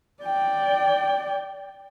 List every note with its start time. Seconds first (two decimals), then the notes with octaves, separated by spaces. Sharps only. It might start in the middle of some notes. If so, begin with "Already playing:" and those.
0.23 D5 G5